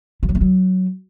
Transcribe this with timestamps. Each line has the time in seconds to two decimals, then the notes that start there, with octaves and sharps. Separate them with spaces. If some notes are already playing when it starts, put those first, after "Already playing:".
0.23 E3
0.29 F#3
0.35 A3
0.41 F#3